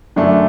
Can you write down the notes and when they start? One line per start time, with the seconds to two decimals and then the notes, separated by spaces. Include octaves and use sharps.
0.16 F#2 D3 A3 D4